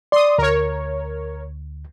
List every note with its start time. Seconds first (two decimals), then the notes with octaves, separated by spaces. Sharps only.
0.12 D5 C6 D#6
0.38 D2 A#4 C#5